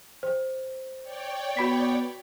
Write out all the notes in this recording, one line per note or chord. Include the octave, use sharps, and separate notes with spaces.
C5
C#5 D5 G5
B3 F#4 B5 B6